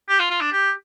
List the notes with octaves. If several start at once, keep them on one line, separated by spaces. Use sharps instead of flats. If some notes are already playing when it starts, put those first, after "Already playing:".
G4
F4
F4
D4
G4